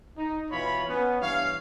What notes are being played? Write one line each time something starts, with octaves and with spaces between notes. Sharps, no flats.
D#4
B2 E3 F4 C#5 B5
B3 C#4
G2 E3 C#5 F5